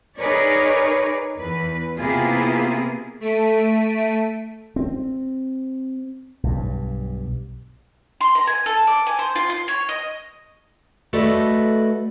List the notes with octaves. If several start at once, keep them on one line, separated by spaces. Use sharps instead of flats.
D#4 G#4 A#4 B4 C#5 D5
E2 B4
C3 A#3 B3 E4 F4 G#4
A3 B6 D7 D#7
C4
B1 G2
C6
A#5
G#5
A4
D6
G#5
C5
F4
C6
C#5
D#5
A3 F#4 A4 B4 D5 D#5